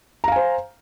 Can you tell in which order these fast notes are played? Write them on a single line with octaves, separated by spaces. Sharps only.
A#5 F5 G#5 C5